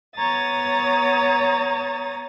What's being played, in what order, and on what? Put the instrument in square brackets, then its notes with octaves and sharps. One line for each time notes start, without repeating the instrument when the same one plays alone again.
[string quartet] B3 C#5 A#5 D#6 A6